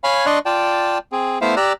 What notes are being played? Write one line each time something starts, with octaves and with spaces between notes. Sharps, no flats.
C#5 F5 G#5 B5
D4 D5 D#5 C6 C#6 F#6
F4 D5 G5 A5
C4 G#4
A3 B3 E4 C5 E5 F5
G4 D5 A#5 E6 F#6